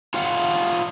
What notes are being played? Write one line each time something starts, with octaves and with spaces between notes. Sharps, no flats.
F4 C#5 F5 F#5